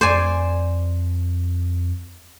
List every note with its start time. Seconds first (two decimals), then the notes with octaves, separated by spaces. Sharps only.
0.01 F2 C5 D5 G#5